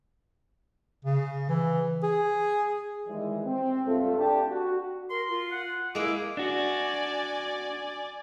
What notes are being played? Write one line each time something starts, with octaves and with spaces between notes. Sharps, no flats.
C#3
E3
G#4
D#3 E3 G3 G#3
C4
C#2 G2 A3 F4 A4
D4 G4 A5
F#4
A#4 C6
F4
F#5
G#3 A#3 E4 D6
D4 F#4 D5 G#5